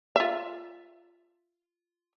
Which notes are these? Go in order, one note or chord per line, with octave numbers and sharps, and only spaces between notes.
F4 E5